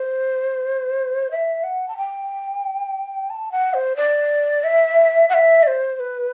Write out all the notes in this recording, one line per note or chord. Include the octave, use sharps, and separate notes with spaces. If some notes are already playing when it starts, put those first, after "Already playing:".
Already playing: C5
E5
F#5
A5
G5
A5
F#5
C5
D5
E5
F#5
E5
D5
C5
C5
B4